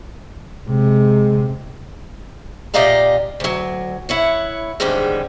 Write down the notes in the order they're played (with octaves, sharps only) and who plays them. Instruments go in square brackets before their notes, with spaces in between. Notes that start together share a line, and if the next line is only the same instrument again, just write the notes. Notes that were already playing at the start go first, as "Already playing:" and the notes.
[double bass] C3 [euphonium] G#3
[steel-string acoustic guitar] A#2 G4 D5 D#5 F5 A#5
D2 F#3
E4 C#5 F#5
E2 G#2 D3 D#3 G3 C#4